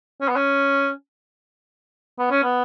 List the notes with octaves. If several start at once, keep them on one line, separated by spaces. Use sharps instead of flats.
C#4
B3
C#4
B3
C#4
B3